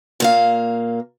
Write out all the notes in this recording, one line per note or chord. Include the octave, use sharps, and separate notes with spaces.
A#2 A#3 F5